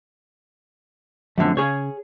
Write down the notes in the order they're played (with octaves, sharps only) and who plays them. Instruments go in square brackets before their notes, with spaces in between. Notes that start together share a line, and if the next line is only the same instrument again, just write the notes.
[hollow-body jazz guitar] F#2 D3 [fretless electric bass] F3 A3 C4
[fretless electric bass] C#3 [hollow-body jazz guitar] G#4 C#5